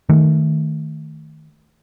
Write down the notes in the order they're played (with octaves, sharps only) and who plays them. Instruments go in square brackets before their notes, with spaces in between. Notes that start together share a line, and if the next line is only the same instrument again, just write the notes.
[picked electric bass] D#3 A3